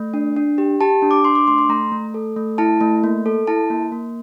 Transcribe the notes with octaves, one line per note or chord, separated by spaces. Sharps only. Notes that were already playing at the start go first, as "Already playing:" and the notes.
Already playing: A3
D4
D4
G4
G4 A5
D4
D6
D4 C6
D6
A3 C6
C6
A3 A#5
A3
A4
A3
E4 A5
A3
A#3
A4
E4 A5
A#3
A#3